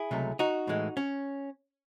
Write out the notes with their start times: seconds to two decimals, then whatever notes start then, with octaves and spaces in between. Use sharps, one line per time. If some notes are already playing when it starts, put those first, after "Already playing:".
Already playing: E4 G#4
0.11 C#2 C3 F#3 A3
0.39 D#4 F#4
0.68 A2 E3 G#3
0.97 C#4